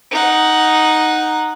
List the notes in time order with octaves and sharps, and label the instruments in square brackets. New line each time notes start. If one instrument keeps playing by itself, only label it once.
[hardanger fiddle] D#4 F#5